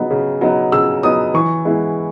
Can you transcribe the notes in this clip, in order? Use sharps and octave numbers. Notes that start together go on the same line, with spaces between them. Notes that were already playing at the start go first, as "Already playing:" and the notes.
Already playing: C#3 F#3 B3 D#4
C#3
F#3 B3 D#4
C#3 E6
F#3 B3 D#4 D#6
E3 C#6
G#3 B3 E4